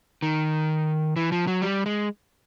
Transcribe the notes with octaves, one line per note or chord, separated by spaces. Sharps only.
D#3
E3
F3
F#3
G3
G#3